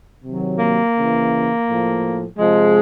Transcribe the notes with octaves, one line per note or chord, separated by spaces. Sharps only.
C3 D#3 F#3
A#3
C#3 E3
A2 F3
C3 F3 G#3